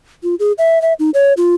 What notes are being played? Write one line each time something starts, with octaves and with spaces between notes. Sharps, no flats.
F4
G#4
E5
E5
D#4
C#5
F4